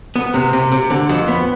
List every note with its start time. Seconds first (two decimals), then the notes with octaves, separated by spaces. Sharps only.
0.16 B3
0.34 C3
0.53 C3
0.72 C3
0.90 D3
1.09 F2
1.28 B3